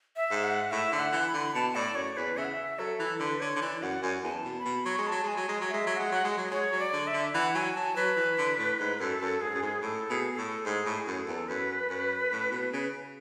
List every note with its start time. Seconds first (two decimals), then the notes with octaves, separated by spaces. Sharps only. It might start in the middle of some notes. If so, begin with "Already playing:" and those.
0.16 E5
0.31 G#2
0.44 F#5
0.71 A2 E5
0.92 D3
0.99 F#5
1.13 E3
1.27 B5
1.34 D3
1.55 B2 A5
1.75 A2 D5
1.95 F#2 C#5
2.16 E2 B4
2.37 C#3 E5
2.45 F#5
2.52 E5
2.79 F#3 A4
2.99 E3
3.20 D3 B4
3.41 D3 C#5
3.56 D3
3.61 E3 D5
3.82 F#2 F#5
4.03 F#2 G#5
4.23 E2 G#5
4.31 A5
4.44 B2
4.59 B5
4.65 B2
4.85 F#3 C#6
4.98 G#3
5.07 F#3 A5
5.23 G#3 G#5
5.36 F#3
5.49 G#3
5.61 F#3
5.69 G#3 E5
5.87 F#3
5.96 G#3 F#5
6.12 F#3
6.24 G#3
6.37 F#3
6.51 G#3 C#5
6.72 F#3
6.79 D5
6.93 D3
7.07 E5
7.13 D3
7.34 E3 F#5
7.55 F#3 G#5
7.76 F#3 A5
7.96 F#3 B4
8.16 E3
8.38 D3
8.58 A2
8.80 G#2
9.00 F#2 A4
9.21 F#2
9.41 G#2 G#4
9.54 F#2
9.62 G#2
9.82 A2 A4
10.10 B2 G#4
10.33 G#4
10.37 A2 A4
10.65 G#2 G#4
10.86 A2
10.93 G#4
11.07 F#2
11.21 A4
11.28 E2
11.48 F#2 B4
11.90 F#2
12.32 A2
12.51 B2
12.73 C#3